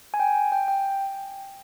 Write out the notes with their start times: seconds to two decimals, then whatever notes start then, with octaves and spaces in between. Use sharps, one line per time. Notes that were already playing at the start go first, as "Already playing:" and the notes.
0.14 G#5
0.20 G5
0.52 G5
0.68 G5